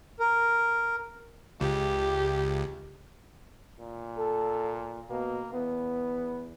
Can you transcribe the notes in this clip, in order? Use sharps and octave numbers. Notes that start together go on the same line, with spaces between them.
A#4
C#2 G4
A#2
A4
B2 A#3
E2 B3